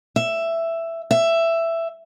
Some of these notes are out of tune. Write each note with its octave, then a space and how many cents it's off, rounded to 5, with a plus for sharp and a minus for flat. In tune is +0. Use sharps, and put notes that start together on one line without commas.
E5 +10
E5 +10